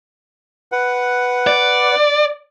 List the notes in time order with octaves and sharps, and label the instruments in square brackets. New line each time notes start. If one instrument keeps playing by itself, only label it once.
[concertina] B4 F#5
[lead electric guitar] D5